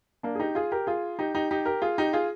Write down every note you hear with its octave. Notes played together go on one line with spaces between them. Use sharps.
A#3 D4
G#4
D#4 G4
F4 G#4
G4 A#4
F4 G#4
D#4 G4
D#4 G4
D#4 G4
G4 A#4
F4 G#4
D#4 G4
F4 G#4